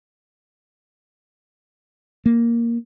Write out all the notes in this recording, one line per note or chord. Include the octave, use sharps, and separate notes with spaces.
A#3